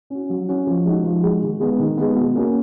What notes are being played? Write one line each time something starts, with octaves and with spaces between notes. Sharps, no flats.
C#4 F#4
F#3
C#4 F#4
F3
G#3 D#4 F#4
F3
G#3 D#4 F#4
D#3
G#3 B3
D#3
G#3 B3
B2
A#3 C#4 F#4